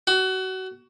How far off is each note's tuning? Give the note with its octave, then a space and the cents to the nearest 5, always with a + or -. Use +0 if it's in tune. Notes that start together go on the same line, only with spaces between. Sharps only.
F#4 +25